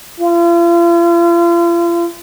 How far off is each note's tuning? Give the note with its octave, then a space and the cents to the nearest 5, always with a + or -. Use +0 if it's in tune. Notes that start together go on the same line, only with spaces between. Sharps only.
F4 -40